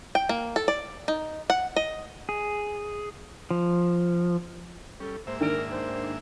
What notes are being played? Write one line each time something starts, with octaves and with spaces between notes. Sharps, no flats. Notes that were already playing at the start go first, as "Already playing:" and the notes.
G5
A#3
A4
D5
D#4
F#5
D#5
G#4
F3
G3 C#4 A4
G#2 A#3 C5 E5
D#3 D4 A#4 D7
C5